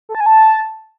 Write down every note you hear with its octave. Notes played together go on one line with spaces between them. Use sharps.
A4
A5
G#5
A5